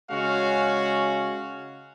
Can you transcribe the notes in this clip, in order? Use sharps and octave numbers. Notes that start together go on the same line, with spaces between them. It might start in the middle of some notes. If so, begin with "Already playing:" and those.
C#3 G#3 C#4 F#4 F5